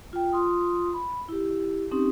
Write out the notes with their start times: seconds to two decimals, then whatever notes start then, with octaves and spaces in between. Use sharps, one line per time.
0.13 F4 G5
0.32 F4 C6 D#6
0.94 B5
1.29 E4 G4
1.91 C4 C#4 D#4 G4